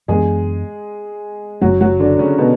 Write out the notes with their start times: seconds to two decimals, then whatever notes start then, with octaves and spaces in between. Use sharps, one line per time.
0.08 F#2 E3 G#3 B3 D4 G#4
1.61 F#1 F#2 C#3 F#3 F#4
1.81 F#3 F#4
1.99 D3 D4
2.19 C#3 C#4
2.38 B2 B3